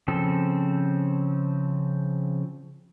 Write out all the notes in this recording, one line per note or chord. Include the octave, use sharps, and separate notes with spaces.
C#3 F3 C4 A4